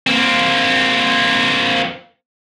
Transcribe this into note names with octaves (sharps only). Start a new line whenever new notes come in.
A#3 C4